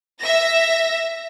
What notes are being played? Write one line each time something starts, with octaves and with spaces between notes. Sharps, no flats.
E5 A#6